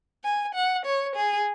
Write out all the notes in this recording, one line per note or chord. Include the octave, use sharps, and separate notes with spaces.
G#5
F#5
C#5
G#4